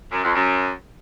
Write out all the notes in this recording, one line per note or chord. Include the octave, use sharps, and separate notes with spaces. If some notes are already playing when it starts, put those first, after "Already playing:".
F#2
F2
F#2